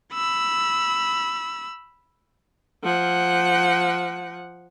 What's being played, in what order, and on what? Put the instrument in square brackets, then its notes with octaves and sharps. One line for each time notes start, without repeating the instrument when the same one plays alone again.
[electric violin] B5 E6
[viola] F3 F#5